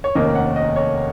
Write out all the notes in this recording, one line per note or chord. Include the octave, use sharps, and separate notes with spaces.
C#5
F1 D#2 D#3 A#3 C#4 D#5
F#5
D#5
C#5